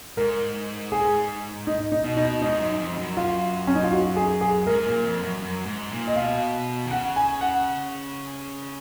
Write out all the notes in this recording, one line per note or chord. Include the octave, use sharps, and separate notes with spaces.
G#2 A#4
G#4
D#4
D#4
B2
D#4
G#2 D#4
F#2
F2
F#2
F4
C#4
D#4
F4
F#4
G#4
G#4
G#2 A#4
A#2
F2
F#2
F#2
G#2
A#2
D#5
B2 F5
D#3
C#3 F#5
G#5
F#5